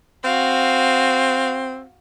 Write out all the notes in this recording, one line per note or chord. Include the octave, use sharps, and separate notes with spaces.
C4 F#4 F5